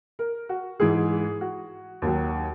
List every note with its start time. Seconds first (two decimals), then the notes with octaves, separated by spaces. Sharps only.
0.19 A#4
0.49 F#4
0.80 G#2 E3 G#4
1.41 F#4
2.02 D#2 D#3 F#3